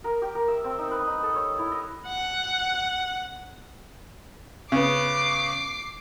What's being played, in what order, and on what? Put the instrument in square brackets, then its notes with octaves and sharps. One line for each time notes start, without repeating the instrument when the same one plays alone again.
[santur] A#4
G4
A#4
E5
C4
D#4
B4
D#4
A4
C#5
E4
D#5
[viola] F#5
[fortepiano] C#3 B3 [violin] D6 C7